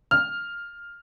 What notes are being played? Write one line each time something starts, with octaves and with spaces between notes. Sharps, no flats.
F6